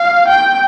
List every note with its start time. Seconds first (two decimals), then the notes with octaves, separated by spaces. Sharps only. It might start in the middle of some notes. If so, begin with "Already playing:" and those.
Already playing: F5
0.28 G5